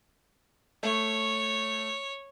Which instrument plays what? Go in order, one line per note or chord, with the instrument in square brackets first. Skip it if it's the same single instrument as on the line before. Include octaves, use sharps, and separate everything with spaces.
[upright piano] A3 [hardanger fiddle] C#5